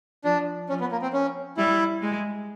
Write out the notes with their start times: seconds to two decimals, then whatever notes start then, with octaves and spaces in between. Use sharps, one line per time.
0.24 F3 D4
0.69 F3 C#4
0.80 B3
0.92 A#3
1.02 C4
1.13 C#4
1.57 G3 E4
2.02 G#3